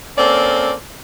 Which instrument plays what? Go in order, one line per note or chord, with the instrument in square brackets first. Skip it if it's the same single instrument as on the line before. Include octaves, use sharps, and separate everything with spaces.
[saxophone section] A#3 C4 C#4 A4 D5